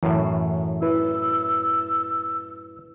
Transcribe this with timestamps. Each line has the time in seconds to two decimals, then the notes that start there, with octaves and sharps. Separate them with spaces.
0.03 F#2 A2 E3
0.82 E4 B4 E6